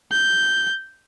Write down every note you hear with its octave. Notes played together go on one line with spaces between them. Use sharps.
G6